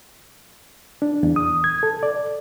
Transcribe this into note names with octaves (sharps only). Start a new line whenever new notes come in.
D4
E2
D#6
G#6
A4
D5